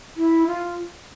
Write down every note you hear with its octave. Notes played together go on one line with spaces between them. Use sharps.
E4
F4